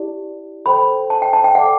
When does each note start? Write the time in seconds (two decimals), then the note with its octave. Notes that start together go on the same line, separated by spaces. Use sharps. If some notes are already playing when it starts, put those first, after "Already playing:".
Already playing: E4 G4 D5
0.65 A4 C5 G5 B5
1.10 A5
1.22 G5
1.33 A5
1.44 G5
1.55 A4 D5 F#5 A5 D6